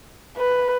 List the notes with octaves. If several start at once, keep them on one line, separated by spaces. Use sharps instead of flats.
B4